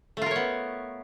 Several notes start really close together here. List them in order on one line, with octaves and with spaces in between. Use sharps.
A3 F4 A#4 C#5 B3